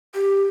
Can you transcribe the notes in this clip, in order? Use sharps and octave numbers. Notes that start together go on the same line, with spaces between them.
G4